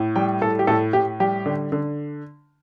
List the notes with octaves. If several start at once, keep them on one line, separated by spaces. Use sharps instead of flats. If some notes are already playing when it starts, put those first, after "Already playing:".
Already playing: A2
G3 G5
A2 A4
G4
A2 A4
A2 G4
G3 G4
D3
D3